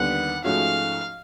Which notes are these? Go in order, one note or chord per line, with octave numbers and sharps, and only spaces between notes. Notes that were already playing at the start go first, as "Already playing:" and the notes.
Already playing: D#2 D3 G3 B3 F#5
G#2 F3 A3 C#4 F#4 F5